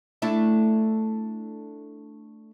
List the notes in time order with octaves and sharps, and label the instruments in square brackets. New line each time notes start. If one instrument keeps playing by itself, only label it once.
[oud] A3 D4 E4